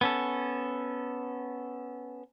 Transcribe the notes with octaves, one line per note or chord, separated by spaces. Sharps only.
B3 C#4 A4